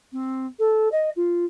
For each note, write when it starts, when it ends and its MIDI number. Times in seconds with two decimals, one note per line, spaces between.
0.13 0.46 60
0.59 0.89 69
0.92 1.10 75
1.16 1.45 65